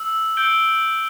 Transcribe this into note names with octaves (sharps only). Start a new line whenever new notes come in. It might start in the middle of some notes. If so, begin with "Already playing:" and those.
Already playing: E6
E6 G6 D7 G7